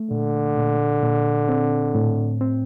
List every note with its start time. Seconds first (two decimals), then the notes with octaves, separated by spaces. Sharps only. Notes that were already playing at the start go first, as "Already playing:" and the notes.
Already playing: A3
0.11 A#2 D3
0.57 A#2
1.03 A#2
1.49 C4
1.95 A2
2.41 C4